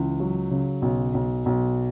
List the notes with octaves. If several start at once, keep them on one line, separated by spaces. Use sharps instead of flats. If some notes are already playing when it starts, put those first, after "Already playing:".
Already playing: C#2 E3
F#3
C#3
B1
B1
B1